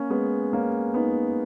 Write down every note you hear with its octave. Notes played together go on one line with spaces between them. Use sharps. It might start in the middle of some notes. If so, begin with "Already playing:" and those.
Already playing: A#3 C#4
G#3 B3
A#3 C#4
B3 D#4